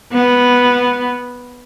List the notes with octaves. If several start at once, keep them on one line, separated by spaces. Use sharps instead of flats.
B3